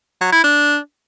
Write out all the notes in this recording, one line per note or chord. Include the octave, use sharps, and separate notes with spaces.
F#3
E4
D4